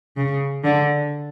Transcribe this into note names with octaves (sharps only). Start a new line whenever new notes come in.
C#3
D3